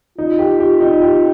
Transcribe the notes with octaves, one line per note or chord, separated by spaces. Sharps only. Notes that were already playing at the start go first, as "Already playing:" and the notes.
D#4 F4
G4
G4
D#4
G4